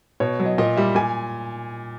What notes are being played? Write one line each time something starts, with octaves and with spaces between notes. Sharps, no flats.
B2 C#5
F#3
D#5
A#2 D#5
G3 E5
A#2 G#5